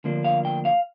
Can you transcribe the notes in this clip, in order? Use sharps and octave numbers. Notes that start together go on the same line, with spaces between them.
D2 D3 F3 A#3 D4
F5
G5
F5